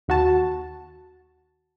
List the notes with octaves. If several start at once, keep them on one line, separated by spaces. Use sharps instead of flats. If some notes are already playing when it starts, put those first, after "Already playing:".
D#2 F#4 A5